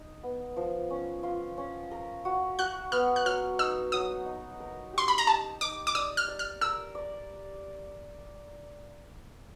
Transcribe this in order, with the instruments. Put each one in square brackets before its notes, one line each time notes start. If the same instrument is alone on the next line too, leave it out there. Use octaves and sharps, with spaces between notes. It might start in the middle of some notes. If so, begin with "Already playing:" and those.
Already playing: [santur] D#4
B3
F3
C#4
F4
C#4
A#4
F#4
[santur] F#4 [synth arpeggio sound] F#6
[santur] B3 [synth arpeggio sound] F6
[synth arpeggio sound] F#6
[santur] F#3 [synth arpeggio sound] F6
[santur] D#4 [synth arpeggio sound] E6
[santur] F#3 [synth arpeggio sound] D#6
[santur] D#4
A#4
[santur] G4 [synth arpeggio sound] C6
[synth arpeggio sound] B5
A#5
[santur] G4 [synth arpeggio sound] A5
[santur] D#4 [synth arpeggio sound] D6
[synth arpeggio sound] D6
[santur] D5 [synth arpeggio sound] D#6
[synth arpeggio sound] F6
[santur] D5
[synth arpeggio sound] F6
[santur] A#4 [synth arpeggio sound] E6
[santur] D5